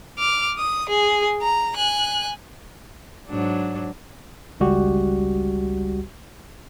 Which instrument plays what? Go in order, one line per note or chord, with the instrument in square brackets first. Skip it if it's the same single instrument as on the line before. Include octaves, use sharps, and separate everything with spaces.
[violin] D6 F6
D#6
G#4
A#5
G#5 F#6
[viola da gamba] G#2 F#3 D4
[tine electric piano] G#1 C#2 G3 F#4 G4